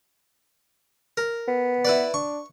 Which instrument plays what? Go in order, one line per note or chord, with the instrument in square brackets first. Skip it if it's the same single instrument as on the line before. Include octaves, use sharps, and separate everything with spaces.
[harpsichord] A#4
[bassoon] B3
[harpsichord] E4 B4 D5
[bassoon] D4 [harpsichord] C#6